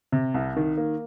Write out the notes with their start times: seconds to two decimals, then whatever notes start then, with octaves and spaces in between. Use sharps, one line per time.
0.12 C3
0.34 C2
0.57 D#3
0.78 A#3